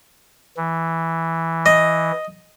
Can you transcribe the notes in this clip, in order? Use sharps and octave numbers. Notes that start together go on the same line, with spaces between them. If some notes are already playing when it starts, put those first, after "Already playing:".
E3
D#5